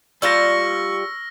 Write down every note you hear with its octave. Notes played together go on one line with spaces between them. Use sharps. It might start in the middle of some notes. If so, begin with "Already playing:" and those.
G3 F4 A5 C#6 E6 F6 A#6